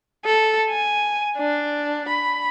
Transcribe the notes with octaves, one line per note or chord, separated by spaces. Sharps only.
A4
G#5
D4
B5